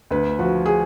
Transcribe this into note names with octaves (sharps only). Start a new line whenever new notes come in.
D2 B4
F3 F#4
G#4